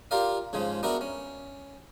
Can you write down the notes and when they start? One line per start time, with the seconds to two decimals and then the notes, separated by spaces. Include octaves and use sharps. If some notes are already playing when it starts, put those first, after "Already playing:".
0.11 F4 G4 A#4 D5 F5
0.53 G#2 C#3 F3 G#3
0.83 B3 D4 F#4 A#4 B4 E5
1.01 C#4